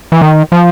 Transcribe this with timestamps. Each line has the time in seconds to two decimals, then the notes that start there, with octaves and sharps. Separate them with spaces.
0.12 E3
0.21 D#3
0.52 F3